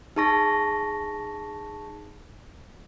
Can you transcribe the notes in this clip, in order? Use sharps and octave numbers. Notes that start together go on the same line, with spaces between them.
D#4 G#4 A5 C#6 A#6